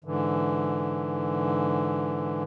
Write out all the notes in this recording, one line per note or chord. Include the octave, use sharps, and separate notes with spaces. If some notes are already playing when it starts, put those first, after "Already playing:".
G#2 D3 E3